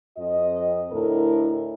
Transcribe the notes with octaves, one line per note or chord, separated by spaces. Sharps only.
F2 F4 D#5
D2 A2 E4 A4 A#4